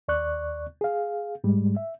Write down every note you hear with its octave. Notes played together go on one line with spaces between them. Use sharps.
D#2 D5 C#6 F#6
G#4 F5
G#2 G3 G#3
E5